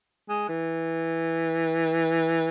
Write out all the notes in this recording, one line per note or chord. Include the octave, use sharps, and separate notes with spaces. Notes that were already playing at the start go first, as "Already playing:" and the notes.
G#3
E3